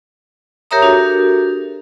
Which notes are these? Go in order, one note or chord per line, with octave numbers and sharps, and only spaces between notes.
G4 A#4 C#5 E5 A#5 D#6
D4 F#4 G4 A4 A#4